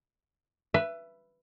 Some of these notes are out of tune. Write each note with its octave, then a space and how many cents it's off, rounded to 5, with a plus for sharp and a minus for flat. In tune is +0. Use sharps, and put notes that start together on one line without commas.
B4 +0 E5 +20